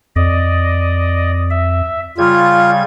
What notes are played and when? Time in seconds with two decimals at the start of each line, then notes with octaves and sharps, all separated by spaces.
0.16 F2 D5 D#5
1.50 E5
2.18 C#3 G3 F4 G#6